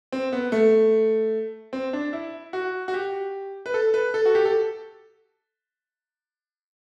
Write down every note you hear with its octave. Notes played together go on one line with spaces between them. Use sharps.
C4
B3
A3
C4
D4
E4
F#4
F#4
G4
B4
A4
B4
A4
F#4
G4
A4